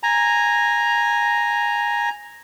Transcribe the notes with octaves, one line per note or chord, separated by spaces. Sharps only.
G#5 A#5